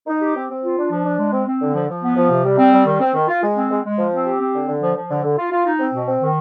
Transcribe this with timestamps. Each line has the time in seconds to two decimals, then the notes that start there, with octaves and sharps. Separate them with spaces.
0.07 D#4
0.22 G4
0.35 C4
0.50 C4
0.63 F4
0.77 D4
0.91 F3
1.05 D4
1.19 G#3
1.32 C4
1.47 C4
1.61 D3
1.75 F3
1.89 F3
2.03 B3
2.17 F3
2.30 C3
2.44 G3
2.58 C4
2.72 G3
2.86 D#3
3.00 C4
3.14 D#3
3.28 F4
3.43 G#3
3.56 C4
3.70 G#3
3.84 G#3
3.98 F3
4.12 C4
4.26 G4
4.40 C4
4.54 D3
4.68 D3
4.81 F3
4.96 F3
5.10 D3
5.24 D3
5.37 F4
5.51 F4
5.65 D#4
5.79 C4
5.93 B2
6.07 C4
6.22 D#3